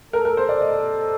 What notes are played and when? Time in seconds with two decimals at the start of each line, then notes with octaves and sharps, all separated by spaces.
0.13 A4 A#4
0.25 A#4
0.37 C5
0.49 D5
0.61 D#5